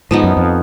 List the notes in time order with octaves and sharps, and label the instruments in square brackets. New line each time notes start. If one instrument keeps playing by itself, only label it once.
[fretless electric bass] G#2 [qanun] F3 B3 D#4
[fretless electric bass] F#2
F2